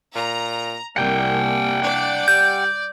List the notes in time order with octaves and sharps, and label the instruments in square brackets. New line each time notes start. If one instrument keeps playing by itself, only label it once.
[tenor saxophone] A#2 [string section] A#5
[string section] C2 A#3 [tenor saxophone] G3 [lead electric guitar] F#5 G5
[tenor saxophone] D4 [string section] D5
[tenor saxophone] G3 [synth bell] G6